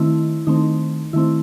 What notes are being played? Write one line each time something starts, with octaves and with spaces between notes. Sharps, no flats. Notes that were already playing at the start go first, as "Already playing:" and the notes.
Already playing: D#3 A3 C4 E4
D#3 A3 C4 D#4
D#3 A3 C4 E4